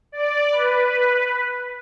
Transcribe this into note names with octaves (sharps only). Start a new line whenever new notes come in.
D5
B4